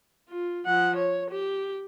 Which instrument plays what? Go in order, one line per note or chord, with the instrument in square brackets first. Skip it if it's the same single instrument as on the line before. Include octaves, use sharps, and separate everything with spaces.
[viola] F4
F3 F#5
C#5
G4